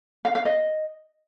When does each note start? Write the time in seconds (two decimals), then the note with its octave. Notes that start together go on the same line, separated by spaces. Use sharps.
0.25 F5
0.35 F5
0.45 D#5